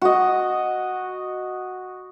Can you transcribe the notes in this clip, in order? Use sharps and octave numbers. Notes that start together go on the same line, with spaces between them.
F#4 D#5